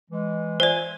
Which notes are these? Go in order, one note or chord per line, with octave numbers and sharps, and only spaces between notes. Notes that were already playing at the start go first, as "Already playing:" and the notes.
E3 G#3
F4 C5 D5 E5 G#5